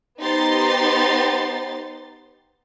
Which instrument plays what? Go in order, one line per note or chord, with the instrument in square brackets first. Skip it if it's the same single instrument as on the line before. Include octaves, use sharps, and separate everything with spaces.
[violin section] B3 D#4 G4 C5 C6 A6